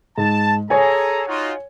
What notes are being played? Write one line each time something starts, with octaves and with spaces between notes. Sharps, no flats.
G#2 A5
G#4 A4 C#5 G#5 A#5
D#4 F4 F#4